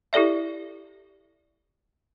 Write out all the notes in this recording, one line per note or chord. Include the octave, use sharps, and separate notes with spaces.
E4 G4 A4 D5 E5